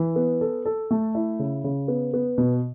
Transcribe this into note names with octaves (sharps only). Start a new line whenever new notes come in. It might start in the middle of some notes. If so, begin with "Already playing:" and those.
Already playing: E3
B3
A4
A4
A3
E4
C#3
C#3
B3
B3
B2